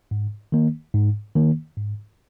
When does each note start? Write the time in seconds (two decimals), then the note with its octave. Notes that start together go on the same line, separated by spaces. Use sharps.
0.11 G#2
0.52 D#3 A#3
0.94 G#2
1.35 D#3 A#3
1.77 G#2